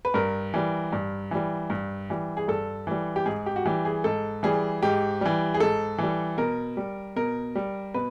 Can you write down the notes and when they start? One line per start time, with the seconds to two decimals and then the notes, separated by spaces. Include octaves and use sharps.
0.05 B4
0.14 G2 A#4
0.54 E3 G3
0.93 G2
1.31 E3 G3
1.70 G2
2.10 E3 G3
2.37 G#4
2.48 G2 A4
2.87 E3 G3
3.16 G4
3.26 G#2 G#4
3.46 G4
3.56 F#4
3.66 E3 G3 G4
3.85 G#4
4.04 G#2 A4
4.43 E3 G3 G#4
4.82 G#2 G4
5.21 E3 G3
5.54 G#4
5.60 G#2 A4
5.98 E3 G3
6.37 B2 A#4
6.77 G3
7.16 B2 A#4
7.55 G3
7.94 B2 B4